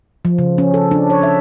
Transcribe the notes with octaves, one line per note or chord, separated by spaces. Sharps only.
F3
C#3
C#4
A4
D4
C#5
E5